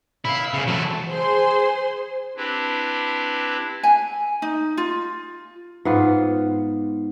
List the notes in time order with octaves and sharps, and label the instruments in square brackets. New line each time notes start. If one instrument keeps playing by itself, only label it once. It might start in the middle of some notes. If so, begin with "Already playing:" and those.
[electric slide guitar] B2 C5 F5 [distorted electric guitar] E4
[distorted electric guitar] C2 C#3
[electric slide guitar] E3 G#3 [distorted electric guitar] F#3 A4
[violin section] G#4 C5 C6
[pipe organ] C4 D4 E4 G4 B4
[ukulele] G#5
D#4
F4
[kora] G#2 B3 F4